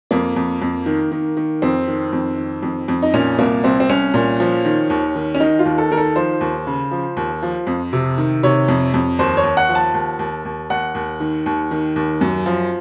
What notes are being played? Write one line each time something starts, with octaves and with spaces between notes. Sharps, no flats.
F2 A#3
F2
F2
D#3
D#3
D#3
F2 C4
D#3
F2
D#3
F2
F2
D#4
A#2 C#4
C2 A#3
C2 C4
C4
C2 C#4
A#2
F3
D#3
D#2
D#3
C#4
D#3 D#4
F4
D#2
A4
D#3 A#4
A4
F3 C5
D#2
C#3
F3
D#2
F3
F2
C3
D#3
C3 C#5
F2
F2
D#2 C5
C#5
D#2
F#5
F3
A5
D#2
D#2
D#2
D#2 F#5
D#2
D#3
D#2
D#3
D#2
F#2
F3